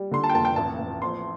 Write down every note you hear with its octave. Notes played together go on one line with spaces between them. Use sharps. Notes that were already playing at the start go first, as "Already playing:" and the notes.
Already playing: G3
D3 C6
A5
G5
F1 A5
G5
A1 A5
A1
F2 C6